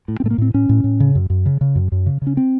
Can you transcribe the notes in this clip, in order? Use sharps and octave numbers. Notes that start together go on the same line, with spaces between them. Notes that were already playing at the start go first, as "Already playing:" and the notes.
A2
C4
A2 A3
A#3
A2 C4
A2 C#4
A2
A2
C#3
F#2
F#2
C#3
C#3
F#2
F#2
C#3
C#3
C#4
C4